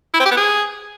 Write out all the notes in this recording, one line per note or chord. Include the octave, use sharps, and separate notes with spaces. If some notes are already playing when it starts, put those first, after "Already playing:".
E4
C4
G4
B3
G#4